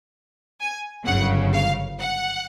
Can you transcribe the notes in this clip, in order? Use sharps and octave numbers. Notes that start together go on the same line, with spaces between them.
G#5
G1 F#2 C#3 F#5
F5
F#5